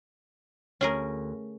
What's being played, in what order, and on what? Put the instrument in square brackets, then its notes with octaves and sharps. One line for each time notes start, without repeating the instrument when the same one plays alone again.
[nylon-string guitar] D2 [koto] C#4 G#4 A#4